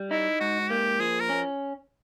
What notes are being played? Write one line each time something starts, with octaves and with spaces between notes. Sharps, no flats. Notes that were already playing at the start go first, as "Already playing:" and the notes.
Already playing: G3
D#4 E4
G#2 F#4
A#3 G4
F3 G#4
A#4
C#4